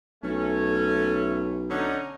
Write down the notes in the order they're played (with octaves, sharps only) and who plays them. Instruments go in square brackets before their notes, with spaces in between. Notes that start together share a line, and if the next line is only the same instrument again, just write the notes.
[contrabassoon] B1 [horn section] A3 C#4
[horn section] D3 C#4 D#4